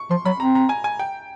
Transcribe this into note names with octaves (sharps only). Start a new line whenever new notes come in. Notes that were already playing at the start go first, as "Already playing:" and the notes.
Already playing: C#6
F3 C6
F#3 B5
C4 A#5
A#5
G#5
G#5
G5